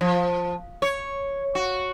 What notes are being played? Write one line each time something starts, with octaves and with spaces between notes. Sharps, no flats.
F3
C#5
F#4